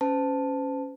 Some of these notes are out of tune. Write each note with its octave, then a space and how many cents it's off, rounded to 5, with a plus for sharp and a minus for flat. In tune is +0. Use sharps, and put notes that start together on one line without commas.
C#4 +0 C5 -40 A5 +0